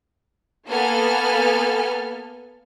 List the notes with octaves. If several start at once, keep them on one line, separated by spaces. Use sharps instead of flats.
A#3 B3 A4 G#5 F6